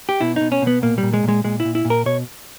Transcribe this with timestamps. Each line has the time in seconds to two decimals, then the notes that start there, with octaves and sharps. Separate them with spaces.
0.09 G4
0.21 B2 E4
0.36 B2 D#4
0.52 C#4
0.62 B2 B3
0.82 A#2 A#3
0.98 G3
1.03 A#2
1.13 G#3
1.23 A#2
1.29 G#3
1.44 A#2 G#3
1.60 E4
1.65 A#2
1.75 E4
1.85 A#2
1.90 A#4
2.06 B2 C#5